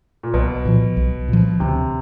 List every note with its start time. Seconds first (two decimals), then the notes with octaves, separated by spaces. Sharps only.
0.23 A#2
0.34 B1 B2
0.65 A#2 F3
0.97 B1
1.28 A#2 F3
1.60 D2 C3